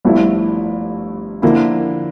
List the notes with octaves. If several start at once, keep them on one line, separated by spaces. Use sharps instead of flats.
G1 G2 F3 A3 E4
D3 F3 A#3 E4